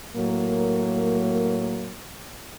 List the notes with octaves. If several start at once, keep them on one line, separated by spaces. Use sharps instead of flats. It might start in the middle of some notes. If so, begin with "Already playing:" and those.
A2 F#3 A#3 A#4